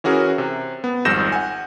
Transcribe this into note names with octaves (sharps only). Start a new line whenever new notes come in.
E3 C#4 F#4 G#4 A#4
C3
B3
G#1 F2 G3 G6 A#6 E7
F#5 G#5